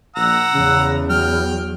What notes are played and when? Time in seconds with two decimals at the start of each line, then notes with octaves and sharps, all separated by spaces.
0.16 A#1 F#5 A#5 E6
0.54 E2 C#3
1.10 F#3 G5 F6